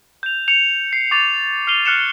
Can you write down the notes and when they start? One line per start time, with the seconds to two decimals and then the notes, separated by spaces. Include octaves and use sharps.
0.23 G6 F7
0.48 G6 C#7 F7
0.93 C7
1.11 C#6 D6 A6 C#7 F7
1.67 F6 C7 D#7 F7 G7
1.86 F6 F#6 C#7 E7